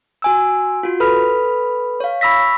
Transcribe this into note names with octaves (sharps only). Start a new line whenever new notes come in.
F#4 G#5 E6
F4 F#4
A4 B4 B5 F6
C#5 F5
B5 C#6 E6 A#6 B6